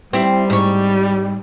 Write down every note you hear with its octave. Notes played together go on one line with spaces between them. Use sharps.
G3 C4 E4
G#2 C#5